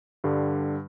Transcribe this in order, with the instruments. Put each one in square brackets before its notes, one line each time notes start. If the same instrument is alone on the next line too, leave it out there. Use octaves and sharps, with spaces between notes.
[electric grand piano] G2 D3 G3